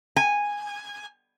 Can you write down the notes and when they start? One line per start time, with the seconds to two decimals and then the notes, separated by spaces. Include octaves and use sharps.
0.16 G#5